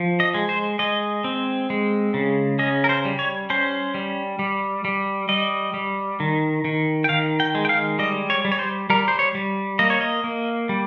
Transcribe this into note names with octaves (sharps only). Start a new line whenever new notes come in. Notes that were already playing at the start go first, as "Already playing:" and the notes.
Already playing: F3
D#5
G#3
C5
G#3 D#5
C4
G#3
C#3
C#4 D#5
A#4
C5
G3
C#5
C#4 C5
G3
G3
G3
G3 D#5
G3
D#3
D#3
G5
D#3 F5
G5
G#3
G5
F5
G3 D#5
C#5
G3
C#5
C5
G3 A#4
C5
C#5
G3
A#3 D#5
C#5
D#5
A#3
G3